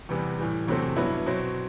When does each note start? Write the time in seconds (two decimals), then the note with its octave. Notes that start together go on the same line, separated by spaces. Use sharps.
0.09 E2 C3 E3 G3 B3
0.39 A2 E3 G3
0.68 E2 C3 F#3 A3 C4
0.97 G2 F#3 B3 E4
1.26 B2 F#3 C4